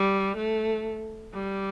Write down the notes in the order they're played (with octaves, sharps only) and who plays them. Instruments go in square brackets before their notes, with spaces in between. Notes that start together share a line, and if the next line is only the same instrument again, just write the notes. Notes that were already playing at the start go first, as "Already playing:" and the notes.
Already playing: [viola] G3
A3
G3